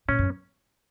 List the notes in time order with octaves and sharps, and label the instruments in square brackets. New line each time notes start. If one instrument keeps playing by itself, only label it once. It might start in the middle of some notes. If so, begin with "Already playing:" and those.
[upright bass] A#2 [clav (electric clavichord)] C#4
[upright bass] F#2